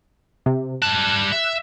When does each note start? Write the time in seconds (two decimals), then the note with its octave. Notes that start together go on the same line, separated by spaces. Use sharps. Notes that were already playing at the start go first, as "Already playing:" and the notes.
0.46 C3
0.82 G3 A5 F#6
1.32 E5